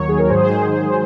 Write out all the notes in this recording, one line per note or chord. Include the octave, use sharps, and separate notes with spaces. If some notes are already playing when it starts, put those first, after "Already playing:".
Already playing: D#2 D#3 F#3 C#5
G#4
A#4
G#2 D#3 F#3 G#4 C5